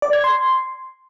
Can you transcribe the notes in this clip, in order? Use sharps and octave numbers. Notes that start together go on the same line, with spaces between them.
D5
G#6
C6